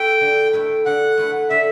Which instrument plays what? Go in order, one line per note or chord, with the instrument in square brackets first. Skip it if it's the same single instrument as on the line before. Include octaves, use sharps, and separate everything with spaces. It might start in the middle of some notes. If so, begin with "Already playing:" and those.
Already playing: [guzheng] A3 E4 B4 [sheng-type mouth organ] G5
[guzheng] D3
A3 E4 B4
[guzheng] D3 [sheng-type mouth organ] F#5
[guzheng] A3 E4 B4
[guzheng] D3 [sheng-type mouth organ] E5